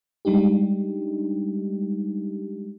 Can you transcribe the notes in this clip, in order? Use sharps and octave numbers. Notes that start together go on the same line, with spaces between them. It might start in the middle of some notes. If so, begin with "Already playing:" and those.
G3 G#3 D4 D#4 G4